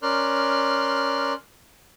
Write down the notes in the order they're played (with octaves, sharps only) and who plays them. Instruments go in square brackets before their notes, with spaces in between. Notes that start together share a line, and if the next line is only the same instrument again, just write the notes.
[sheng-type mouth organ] C#4 A#4 D5 C6 F6 F#6